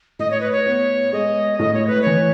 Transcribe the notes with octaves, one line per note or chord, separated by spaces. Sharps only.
A2 D#5
C#5
B4
C#5
B3
G#3 D#5
A2 D#5
C#5
B4
E3 C#5